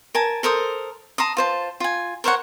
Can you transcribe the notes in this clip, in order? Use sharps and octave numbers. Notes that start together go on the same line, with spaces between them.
A#4 G#5 A5
A4 A#4 C5 D#6
A5 A#5 C6 D#6
F4 C5 A5
F4 G#5
A#4 C5 C#5 F#5